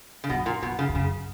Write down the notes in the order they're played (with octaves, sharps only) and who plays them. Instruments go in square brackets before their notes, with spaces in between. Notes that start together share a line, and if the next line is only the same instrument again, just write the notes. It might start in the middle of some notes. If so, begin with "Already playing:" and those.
[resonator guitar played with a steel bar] C#3
[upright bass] F#2 [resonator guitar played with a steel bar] B2
[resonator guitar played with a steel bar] A#2
[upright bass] F#2 [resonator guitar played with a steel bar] B2
[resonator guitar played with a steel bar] C#3
[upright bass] F2
[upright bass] F#2 [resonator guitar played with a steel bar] C#3